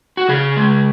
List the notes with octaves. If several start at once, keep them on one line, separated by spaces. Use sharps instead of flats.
F#4
C#3 G#4
G#3